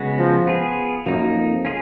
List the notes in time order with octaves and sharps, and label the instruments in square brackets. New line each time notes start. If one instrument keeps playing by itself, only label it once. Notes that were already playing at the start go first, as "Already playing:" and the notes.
Already playing: [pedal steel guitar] C#3 G#3 B3 F#4
[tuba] F3
[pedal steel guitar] B3 F4 G#4
[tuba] F#2 [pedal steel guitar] F3 A#3 D#4
[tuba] F2
[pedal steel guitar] C#4 F4 G#4